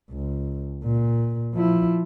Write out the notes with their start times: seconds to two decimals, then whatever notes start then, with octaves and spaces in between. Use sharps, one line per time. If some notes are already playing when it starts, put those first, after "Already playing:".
0.11 C#2
0.84 A#2
1.54 F3 E4